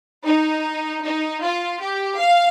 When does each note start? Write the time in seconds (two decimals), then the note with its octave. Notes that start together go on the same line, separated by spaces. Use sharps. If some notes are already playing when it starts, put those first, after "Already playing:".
0.25 D#4
1.03 D#4
1.42 F4
1.81 G4
2.20 F5